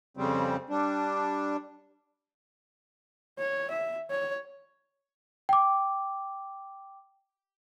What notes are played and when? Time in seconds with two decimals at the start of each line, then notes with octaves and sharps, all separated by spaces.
0.17 F2 C#3 G3 C4
0.70 G3 D4
3.39 C#5
3.71 E5
4.10 C#5
5.49 G5 D6